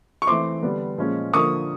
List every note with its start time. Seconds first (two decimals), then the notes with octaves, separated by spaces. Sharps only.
0.22 C#6
0.27 E3 A3 C4 C6 D6
0.63 D3 G3 B3 D4
0.98 A#2 F3 G#3 C#4
1.33 D3 F3 A#3 C#6 D#6